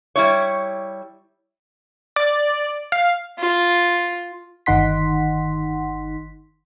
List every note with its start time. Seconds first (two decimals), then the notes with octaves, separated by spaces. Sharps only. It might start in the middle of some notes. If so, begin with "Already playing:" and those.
0.16 G3 E4 C#5
2.16 D5
2.92 F5
3.39 F4
4.66 G1 D#3 D#4 F#5 C6 B6